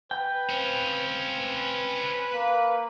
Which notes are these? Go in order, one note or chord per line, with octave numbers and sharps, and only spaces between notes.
B4 G5
C4 C#4 F4
B4
A#3